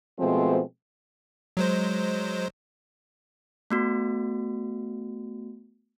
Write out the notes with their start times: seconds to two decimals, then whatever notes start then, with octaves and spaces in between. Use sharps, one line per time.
0.19 B2 F3 G#3 A3 C4
1.57 F#3 G#3 C5
3.70 A3 B3 F#4